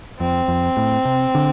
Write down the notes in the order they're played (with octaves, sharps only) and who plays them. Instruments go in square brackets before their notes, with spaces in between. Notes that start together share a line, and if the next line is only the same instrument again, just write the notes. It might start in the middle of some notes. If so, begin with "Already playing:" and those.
[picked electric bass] F2 [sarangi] C4
[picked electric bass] F2
A2
C3
D3